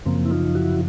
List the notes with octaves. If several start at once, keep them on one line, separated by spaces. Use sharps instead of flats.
F#2 C#3 F3 A#3 C4
E4
D#4 F4
E4 F#4